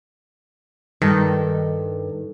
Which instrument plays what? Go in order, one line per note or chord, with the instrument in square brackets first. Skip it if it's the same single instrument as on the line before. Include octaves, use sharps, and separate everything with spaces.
[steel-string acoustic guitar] G2 [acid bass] D#3 [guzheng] A4